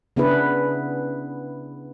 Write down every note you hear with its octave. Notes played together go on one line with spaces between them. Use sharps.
C#3 B3 D4 E4 G#4 B4